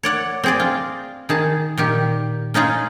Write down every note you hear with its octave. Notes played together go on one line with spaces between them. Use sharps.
C#5 D5 F#5
C4 G#4 D5
F4
D#3 G#4 A5
A#2 D#3 G4
C#4 D#4 F4 G#4